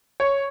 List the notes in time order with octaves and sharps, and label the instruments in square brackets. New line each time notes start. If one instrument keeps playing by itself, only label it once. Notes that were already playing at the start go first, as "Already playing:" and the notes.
[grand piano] C#5